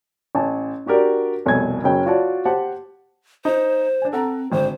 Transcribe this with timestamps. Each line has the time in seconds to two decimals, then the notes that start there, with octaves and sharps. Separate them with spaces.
0.35 A1 G#5 A5
0.86 D4 F#4 G4 A#4 D5
1.46 F1 C2 B2 C#5 G#5 G#6
1.84 F#1 F#3 C#4 G5
2.06 F4 F#4 C#5 D5 A5
2.45 G4 C5 F#5 A5
3.45 D#4 C5
4.02 D4 G#5
4.13 C4 A4 F#5 A#5
4.52 G#1 D3 C5